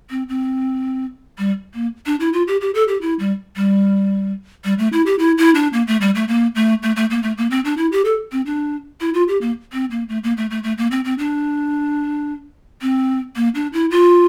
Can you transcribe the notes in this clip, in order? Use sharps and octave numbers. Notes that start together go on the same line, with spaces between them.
C4
C4
G3
A#3
D4
E4
F4
G4
G4
A4
G4
E4
G3
G3
G3
A3
E4
G4
E4
E4
D4
A#3
A3
G3
A3
A#3
A3
A3
A3
A#3
A3
A#3
C4
D4
E4
G4
A4
C4
D4
E4
F4
G4
A#3
C4
A#3
A3
A#3
A3
A3
A3
A#3
C4
C4
D4
C4
A#3
D4
E4
F4